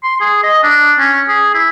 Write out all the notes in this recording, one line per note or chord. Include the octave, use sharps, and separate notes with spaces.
C6
G#4
D#5
D4
C#4
G#4
E4